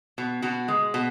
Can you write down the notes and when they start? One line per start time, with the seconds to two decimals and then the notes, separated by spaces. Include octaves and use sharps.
0.18 B2
0.42 B2 F#4
0.68 G#3
0.94 B2